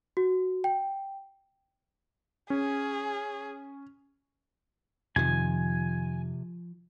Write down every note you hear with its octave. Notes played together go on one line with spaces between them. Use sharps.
F#4
G5
C#4 G#4
F2 C3 D#3 F3 G#5